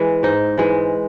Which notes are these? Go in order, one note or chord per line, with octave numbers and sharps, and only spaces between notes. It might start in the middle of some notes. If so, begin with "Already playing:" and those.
Already playing: E3 G#3
G#2 D#4
E3 G#3